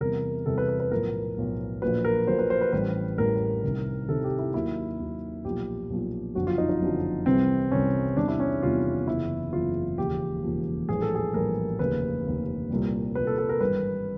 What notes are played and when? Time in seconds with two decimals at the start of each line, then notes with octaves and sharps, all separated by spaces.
0.01 E2 C3 E3 G3 A#4
0.46 E2 C3 E3 G3 A4
0.58 B4
0.69 B4
0.80 B4
0.91 B1 A2 F3 A#4
1.37 B1 A2 F3
1.82 A#1 A#2 F#3 B4
2.05 A#4
2.27 A#1 A#2 F#3 C5
2.39 B4
2.50 C5
2.61 B4
2.73 A1 A2 E3 G3 B4
3.18 A1 A2 E3 G3 A#4
3.63 C2 C3 D#3
4.09 C2 C3 D#3 A4
4.24 G4
4.39 E4
4.54 D#2 D#3 F#3 E4
5.00 D#2 D#3 F#3
5.45 B1 A#2 F3 G4
5.90 B1 A#2 F3
6.35 F#1 F2 D3 F#3 F#4
6.47 F4
6.58 D#4
6.69 D#4
6.81 F#1 F2 D3 F#3
7.26 C2 C3 E3 G3 C4
7.71 C2 C3 E3 G3 C#4
8.16 E2 C3 D#3 G3 D4
8.28 E4
8.40 C#4
8.62 E2 C3 D#3 G3 F4
9.07 F#1 E2 C#3 E3 E4
9.53 F#1 E2 C#3 E3 F4
9.98 E1 D#2 C#3 F3 G4
10.43 E1 D#2 C#3 F3
10.89 A#1 A2 E3 G3 G#4
11.02 A4
11.15 G#4
11.34 A#1 A2 E3 G3 A#4
11.79 F1 D#2 C#3 B4
12.25 F1 D#2 C#3
12.70 C2 A#2 G3
13.15 C2 A#2 G3 B4
13.27 A4
13.38 A4
13.49 A#4
13.61 G#1 G2 E3 G3 B4